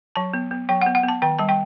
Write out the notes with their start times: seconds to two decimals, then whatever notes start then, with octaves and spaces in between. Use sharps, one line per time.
0.16 F#3 A5
0.33 B3
0.51 B3
0.69 F#3 G5
0.82 F#5
0.86 B3
0.95 F#5
1.03 B3
1.08 A5
1.22 D#3 G5
1.39 G3 A5
1.49 G5